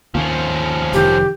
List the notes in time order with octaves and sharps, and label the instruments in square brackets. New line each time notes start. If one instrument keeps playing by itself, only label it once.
[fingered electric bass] D#2 [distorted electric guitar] F3 C#4
[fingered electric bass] F1 D#3 [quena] G4